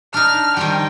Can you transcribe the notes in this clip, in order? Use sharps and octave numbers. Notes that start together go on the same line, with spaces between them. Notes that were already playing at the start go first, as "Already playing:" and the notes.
D4 D#4 F6
D#3 F3 G3 G5